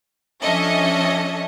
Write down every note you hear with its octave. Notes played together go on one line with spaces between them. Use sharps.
F3 C#4 D4 A4 D#5 E5